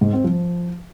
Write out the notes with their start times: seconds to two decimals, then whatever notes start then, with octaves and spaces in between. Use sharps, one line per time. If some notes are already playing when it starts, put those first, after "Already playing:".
0.01 G#2
0.13 C4
0.24 F3